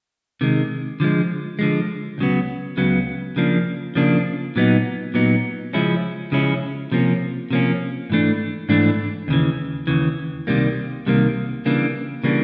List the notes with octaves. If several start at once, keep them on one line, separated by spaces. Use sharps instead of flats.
C3 D#3 G#3
D3 F3 G#3
D3 F3 G#3
C#2 C#3 F#3 B3
C#2 C#3 F#3 B3
C#3 F3 A#3 D4
C#3 F3 A#3 D4
A#2 F#3 B3 D#4
A#2 F#3 B3 D#4
C#3 F3 G#3 C#4 E4
C#3 F3 G#3 C#4 E4
C3 F3 A#3 C#4
C3 F3 A#3 C#4
G#2 E3 A3 D4
G#2 E3 A3 D4
D#2 C#3 E3
D#2 C#3 E3
C2 C3 D#3 G3 A#3
C2 C3 D#3 G3 A#3
C#3 E3 G3 A#3 D4
C#3 E3 G3 A#3 D4